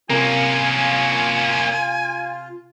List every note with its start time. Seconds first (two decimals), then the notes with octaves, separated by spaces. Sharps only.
0.10 C3 A#3 C#4 F4 A#4 G#5